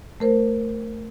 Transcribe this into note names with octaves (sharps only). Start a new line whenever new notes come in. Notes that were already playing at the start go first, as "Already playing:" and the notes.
A3 A#4 C5